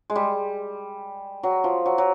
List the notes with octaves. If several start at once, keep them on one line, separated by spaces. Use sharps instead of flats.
G#3
G3
F#3
F3
F#3
F#3